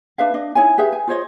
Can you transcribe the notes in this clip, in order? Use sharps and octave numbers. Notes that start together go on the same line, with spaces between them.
D4 B4 E5 F5
D4 D#5
D#4 E4 C#5 G#5
G4 G#4 B4 E5
G#5
F4 C5 C#5 D#5